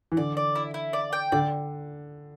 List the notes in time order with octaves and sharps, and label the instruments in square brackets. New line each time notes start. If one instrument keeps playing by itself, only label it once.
[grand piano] E3
[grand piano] D3 [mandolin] D5
[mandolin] D5
E4
E4
D5
G5
[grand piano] D3 [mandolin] D5